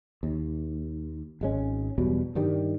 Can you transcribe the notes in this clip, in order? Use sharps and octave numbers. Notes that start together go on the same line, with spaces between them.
D#2
G#1 G#3 C#4
E2 B2 F#3 G3
G2 D#3 G3